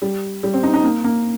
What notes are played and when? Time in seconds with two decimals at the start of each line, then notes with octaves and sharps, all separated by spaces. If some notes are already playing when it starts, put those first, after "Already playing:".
0.02 G3
0.43 G3
0.54 C4
0.63 D#4
0.74 D#4
0.84 A#3
1.04 A#3